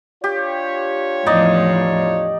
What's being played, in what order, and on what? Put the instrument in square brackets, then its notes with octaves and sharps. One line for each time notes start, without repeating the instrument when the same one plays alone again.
[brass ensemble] D4 F4 C#5 [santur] G4
[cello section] E2 A2 F3 [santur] D#4 D5 D#5